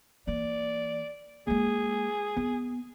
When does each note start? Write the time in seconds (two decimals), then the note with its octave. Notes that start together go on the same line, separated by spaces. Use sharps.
0.27 E3 A#3 D5
1.47 G#3 A#3 G#4
2.37 B3